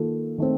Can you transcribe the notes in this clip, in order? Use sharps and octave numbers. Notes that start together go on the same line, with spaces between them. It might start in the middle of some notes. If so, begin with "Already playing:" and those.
Already playing: D#3 A#3 F4 A4
D#3 A3 C4